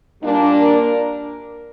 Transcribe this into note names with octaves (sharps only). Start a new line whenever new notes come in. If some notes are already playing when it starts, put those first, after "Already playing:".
A#2 G3 A#3 D4
A#4